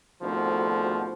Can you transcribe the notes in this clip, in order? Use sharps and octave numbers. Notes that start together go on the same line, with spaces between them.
G#1 D2 G#2 B2 D3 F3